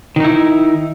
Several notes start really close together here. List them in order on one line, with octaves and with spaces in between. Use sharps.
D#3 D#4 E4